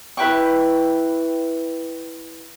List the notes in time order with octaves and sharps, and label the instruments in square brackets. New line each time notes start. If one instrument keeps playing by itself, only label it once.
[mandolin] E4 B4 G5 C#6